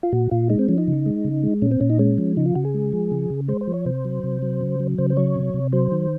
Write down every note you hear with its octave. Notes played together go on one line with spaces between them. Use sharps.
F4
A#2 F#4
A#2 F4
G#3 D#4
C4
F3 C#4
D#4
C#3
G#3
C#3
G#3
A#2 C#4
C4
A#2 C#4
D#4
G#3 C#4
F3
C#3 D#4
F4
C#3 F#4
G#4
G#3
F3
C#3
C#3
G#3 C5
C5
F3
C#5
C3 C5
F#3
C3
F#3
C#3
F#3
C#3 C5
C5
F#3 C#5
C3
C3
F#3 C5
D#3